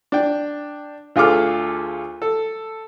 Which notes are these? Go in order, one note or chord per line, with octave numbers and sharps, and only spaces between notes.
D4 G5
D2 F4 G#4 A4 D6 F6
A4